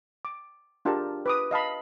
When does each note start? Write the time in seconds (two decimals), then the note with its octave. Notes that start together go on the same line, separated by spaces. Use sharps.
0.25 D6
0.85 D4 F4 G4 G#4 A#4 A5
1.26 B4 D6 D#6
1.51 D#5 F5 A5 B5